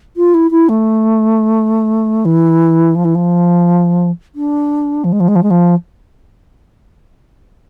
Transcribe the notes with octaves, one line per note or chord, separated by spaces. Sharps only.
F4
E4
E4
A3
E3
F3
E3
F3
D4
F3
G#3
F3
G#3
F3
G#3
F3